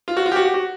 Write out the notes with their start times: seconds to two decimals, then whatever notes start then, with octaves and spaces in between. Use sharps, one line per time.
0.08 F4
0.17 F#4
0.26 F4
0.32 G4
0.36 F#4
0.45 G4
0.54 F#4